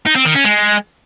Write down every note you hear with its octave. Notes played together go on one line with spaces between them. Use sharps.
D#4
C4
D#3
C#4
G#3